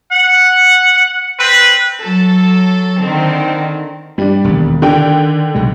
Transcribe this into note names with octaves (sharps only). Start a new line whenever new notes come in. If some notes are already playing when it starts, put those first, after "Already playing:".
F#5
C4 B4
F#3 A4
D3 D#3 C4
G2 G3 D4
E1 D#2
D3 D#3 D4 G5
B1 C3 G#3